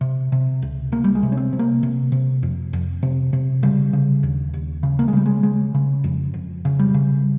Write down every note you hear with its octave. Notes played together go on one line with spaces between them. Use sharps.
C3
C3
C#2
C#2 A#3
G3
G#3
C3
C#4
C4
C3
A#3
C3
C3
F2
F2
C3
C3
C#3 G3
C#3
D#2
D#2
C#3
A#3
G#3
C#3 G3
G#3
C#3 G#3
C#3
F2
F2
C#3
G3
C#3